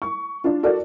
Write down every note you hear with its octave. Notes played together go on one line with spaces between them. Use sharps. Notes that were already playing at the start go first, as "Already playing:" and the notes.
C#6
D4 F4
F#4 A4 A#4 D5